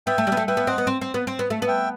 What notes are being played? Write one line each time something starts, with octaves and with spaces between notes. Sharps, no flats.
B3 E5 G5
A3
G3
B3
A3
B3 E5 G5
B3
C4 D#5 F#5
B3
C4
C4
B3
C4
B3
A3
B3
E5 G5